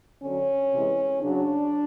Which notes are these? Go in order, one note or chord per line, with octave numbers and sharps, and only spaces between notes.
D3 F#3 C#4
C3 E3 G#3
C#3 F#3 D4